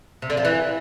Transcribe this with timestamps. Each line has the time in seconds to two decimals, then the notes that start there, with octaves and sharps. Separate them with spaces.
0.22 C3
0.30 D3
0.37 F3
0.45 E3